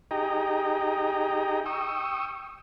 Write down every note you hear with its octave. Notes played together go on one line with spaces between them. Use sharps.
D#4 G4 G#4 D#5 G5 A#5
G5 C#6 D#6 E6